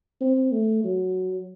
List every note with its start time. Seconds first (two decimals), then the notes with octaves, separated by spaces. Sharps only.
0.21 C4
0.52 A3
0.84 F#3